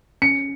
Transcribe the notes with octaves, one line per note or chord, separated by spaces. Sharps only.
C#4 C#7